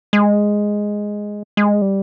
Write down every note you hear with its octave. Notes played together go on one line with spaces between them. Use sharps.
G#3
G#3
G3